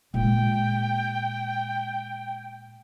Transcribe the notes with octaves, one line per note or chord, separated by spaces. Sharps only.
A#2 G#3 G5